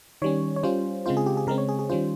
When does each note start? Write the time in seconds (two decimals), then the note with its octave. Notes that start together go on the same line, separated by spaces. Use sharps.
0.22 D#3 G3 C#4 C#5
0.56 C#5
0.63 G3 C#4 F4 C5
1.06 C#3 G#3 C4 F4 C5
1.17 G#4
1.26 G4
1.37 G#4
1.47 C#3 G#3 C4 A#4
1.58 C#5
1.69 G#4
1.79 G#4
1.89 D#3 G3 C#4 F4 C5